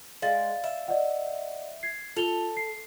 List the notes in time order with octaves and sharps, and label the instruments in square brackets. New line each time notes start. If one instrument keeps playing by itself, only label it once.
[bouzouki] G#3 [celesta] D5 F5 A6
[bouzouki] E5
[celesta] D5 D#5 F#5
G#6 C7
[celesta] F4 F7 G7 [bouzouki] A4
[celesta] C7